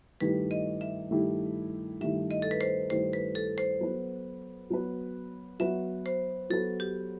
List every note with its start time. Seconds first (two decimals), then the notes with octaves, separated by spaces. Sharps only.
0.21 G2 D#3 A3 E4 G4 B4
0.51 D#5
0.81 E5
1.11 G2 D#3 A3 E4 G4
2.00 G2 D#3 A3 E4 G4 E5
2.31 D#5
2.42 A4
2.51 B4
2.61 C5
2.90 G2 D#3 A3 E4 G4 C5
3.13 B4
3.35 A4
3.58 C5
3.80 F#3 B3 F#4 B4
4.70 F#3 B3 F#4 B4
5.60 F#3 B3 F#4 B4 E5
6.06 C5
6.50 F#3 B3 F#4 A4 B4
6.80 G4